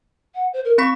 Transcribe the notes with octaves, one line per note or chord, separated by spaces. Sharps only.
F#5
C5
A#4
C4 B5 C#6 B6